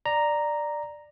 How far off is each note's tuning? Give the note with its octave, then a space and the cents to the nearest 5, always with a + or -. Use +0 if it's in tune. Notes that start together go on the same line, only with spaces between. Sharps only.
D5 +10 A#5 +0